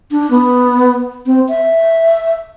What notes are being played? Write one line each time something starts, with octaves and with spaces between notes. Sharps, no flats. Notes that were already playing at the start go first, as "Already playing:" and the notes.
D4
B3
C4
E5